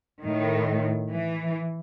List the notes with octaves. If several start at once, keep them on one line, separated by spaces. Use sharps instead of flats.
A2 D#3
E3